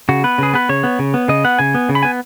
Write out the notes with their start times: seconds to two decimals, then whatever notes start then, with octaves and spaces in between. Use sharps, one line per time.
0.09 C#3 F#4
0.24 B3 B4
0.38 C#3 G#4
0.54 B3 B4
0.69 C#3 C#5
0.83 B3
0.99 C#3
1.14 B3
1.28 C#3 D#5
1.44 B3 F#5
1.59 C#3 G#5
1.75 B3
1.89 C#3
1.95 B5
2.03 B3 G#5